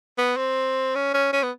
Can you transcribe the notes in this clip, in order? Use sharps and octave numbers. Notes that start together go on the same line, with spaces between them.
B3
C4
C#4
C#4
C#4
B3